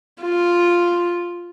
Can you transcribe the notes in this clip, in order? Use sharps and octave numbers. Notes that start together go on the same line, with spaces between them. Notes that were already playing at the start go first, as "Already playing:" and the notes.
F4